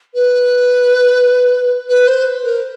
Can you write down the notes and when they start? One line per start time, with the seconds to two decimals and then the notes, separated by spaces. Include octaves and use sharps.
0.14 B4
1.89 B4
2.07 C5
2.44 A#4